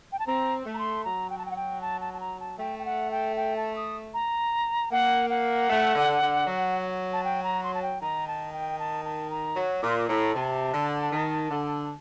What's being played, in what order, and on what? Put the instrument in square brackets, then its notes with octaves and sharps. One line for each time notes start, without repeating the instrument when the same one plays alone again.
[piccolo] G5
A5
[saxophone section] C4 [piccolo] A#5
[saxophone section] A3
[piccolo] A#5
C6
[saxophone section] F#3 [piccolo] A#5
[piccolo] G5
A5
G5
F#5
G5
A5
A5
A5
A#5
A5
[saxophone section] A3 [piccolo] G5
[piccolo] G5
F#5
G5
G5
A5
D#6
A#5
[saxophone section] A#3 [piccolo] F#5
[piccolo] F#5
[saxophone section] A3
D3
D3
F#3
[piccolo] A5
G5
A#5
C6
A5
G5
[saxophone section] D#3 [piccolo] A#5
[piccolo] A5
G5
A5
A5
A#5
[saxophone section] F#3
[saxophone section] A#2 [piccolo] D6
[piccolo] C6
D6
[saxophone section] A2 [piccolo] A#5
[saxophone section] C3 [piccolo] A5
[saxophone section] D3
D#3
D3